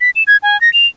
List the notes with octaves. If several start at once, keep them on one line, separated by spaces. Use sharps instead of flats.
B6
E7
G#6
G#5
A#6
F7